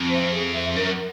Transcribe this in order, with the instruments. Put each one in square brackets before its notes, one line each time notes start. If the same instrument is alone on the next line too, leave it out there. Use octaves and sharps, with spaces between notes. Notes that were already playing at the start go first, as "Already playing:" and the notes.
Already playing: [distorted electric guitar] F2
[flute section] C5 E5
G#4
C5 E5
[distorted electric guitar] F#2 [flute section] A#4